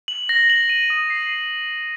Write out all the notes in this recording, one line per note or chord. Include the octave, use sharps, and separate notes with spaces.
F#7
A#6
F#7
D#7
D#6
C7
D#7